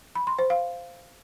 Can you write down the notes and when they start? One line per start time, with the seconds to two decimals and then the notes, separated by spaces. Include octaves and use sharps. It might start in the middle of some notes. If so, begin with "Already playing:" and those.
0.15 B5
0.27 C6
0.39 C5
0.50 F5